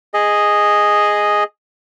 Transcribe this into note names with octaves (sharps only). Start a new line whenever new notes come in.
G#4 D#5